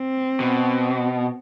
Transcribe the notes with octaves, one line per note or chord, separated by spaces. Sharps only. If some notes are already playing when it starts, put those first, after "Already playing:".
Already playing: C4
B2